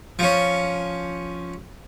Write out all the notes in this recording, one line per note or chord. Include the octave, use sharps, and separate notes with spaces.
F3 C#4